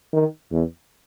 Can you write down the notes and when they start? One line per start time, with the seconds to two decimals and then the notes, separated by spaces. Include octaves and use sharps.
0.13 D#3
0.51 E2